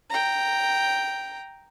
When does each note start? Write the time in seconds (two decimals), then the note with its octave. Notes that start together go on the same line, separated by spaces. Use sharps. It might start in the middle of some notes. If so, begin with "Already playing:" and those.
0.10 G5 A#5